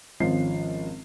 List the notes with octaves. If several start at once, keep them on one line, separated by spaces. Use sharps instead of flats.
G#1 F3 C4 C#4 C7